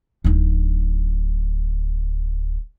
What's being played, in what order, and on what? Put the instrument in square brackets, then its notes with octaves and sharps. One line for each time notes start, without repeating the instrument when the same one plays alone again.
[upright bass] D1 D#4